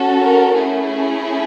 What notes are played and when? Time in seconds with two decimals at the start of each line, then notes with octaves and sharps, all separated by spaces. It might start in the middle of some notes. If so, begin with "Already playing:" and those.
Already playing: C#4 F#4 A4
0.19 A#4
0.58 A3 C#4 E4 G#4